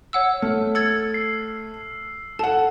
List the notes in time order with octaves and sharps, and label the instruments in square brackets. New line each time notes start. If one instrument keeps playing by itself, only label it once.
[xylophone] C#5 F#5 E6
[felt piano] A3 [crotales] F6
[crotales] E6 [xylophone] G#6 A6 C#7
[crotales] C7
[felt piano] A4 F#5 [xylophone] A5